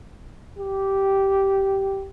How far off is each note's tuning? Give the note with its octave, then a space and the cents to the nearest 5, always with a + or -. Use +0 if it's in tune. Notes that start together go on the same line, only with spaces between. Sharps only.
G4 -10